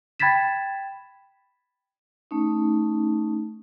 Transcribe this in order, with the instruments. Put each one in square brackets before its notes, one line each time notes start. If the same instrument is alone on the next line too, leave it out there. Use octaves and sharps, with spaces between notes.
[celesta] G5 B5 G#6 A6 B6 E7
[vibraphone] A3 C#4 D#4